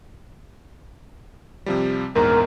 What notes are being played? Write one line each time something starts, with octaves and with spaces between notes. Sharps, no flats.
C3 F3 G3
A#1 E2 G#2 A#4